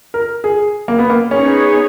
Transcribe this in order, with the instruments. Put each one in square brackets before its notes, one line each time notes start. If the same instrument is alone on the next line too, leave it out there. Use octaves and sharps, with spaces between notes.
[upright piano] A#4
G#4
A#3
B3
A#3
[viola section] B3 D#4 G#4 C#5 [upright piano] C#4